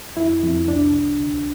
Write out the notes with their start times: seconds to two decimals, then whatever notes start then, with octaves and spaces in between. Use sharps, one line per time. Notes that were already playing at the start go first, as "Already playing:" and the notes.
0.17 F2 E4
0.43 F2
0.68 C2 D4
0.94 C2
1.20 D2